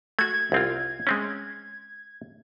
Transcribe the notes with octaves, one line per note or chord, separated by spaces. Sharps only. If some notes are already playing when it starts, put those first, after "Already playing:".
A3 F#4 G#6
C2 C4 F4
G#3 C4 C#4